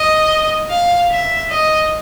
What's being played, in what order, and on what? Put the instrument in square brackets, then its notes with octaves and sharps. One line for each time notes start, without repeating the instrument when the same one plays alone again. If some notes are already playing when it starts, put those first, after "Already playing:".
Already playing: [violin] D#5
F5
E5
D#5